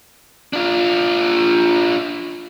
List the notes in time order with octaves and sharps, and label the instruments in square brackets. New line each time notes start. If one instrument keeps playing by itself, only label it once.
[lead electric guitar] D4 F4